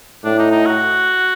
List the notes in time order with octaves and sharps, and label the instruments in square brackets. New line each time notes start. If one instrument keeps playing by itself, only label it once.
[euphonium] A2 [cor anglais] D4
[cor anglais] D#4
D#4
F#4